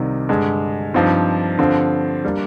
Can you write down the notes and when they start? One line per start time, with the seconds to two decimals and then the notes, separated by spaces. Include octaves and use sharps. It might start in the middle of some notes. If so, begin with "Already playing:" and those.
Already playing: C2 C3 D#3 G3
0.29 G2 D3 G#3
0.94 G2 F3 C4 D#4
1.59 G2 D3 F3 C4
2.25 G3 A#3 D4